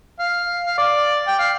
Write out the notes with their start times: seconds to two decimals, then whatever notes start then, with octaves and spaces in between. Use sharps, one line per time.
0.19 F5
0.66 F5
0.78 D5
1.28 G5
1.39 F5